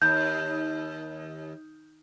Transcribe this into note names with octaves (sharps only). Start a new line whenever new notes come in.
D#2 G6